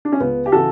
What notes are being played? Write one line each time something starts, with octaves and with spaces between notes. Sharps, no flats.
D4
C#4
C#2 B3
G4
C#3 E3 F#4 A4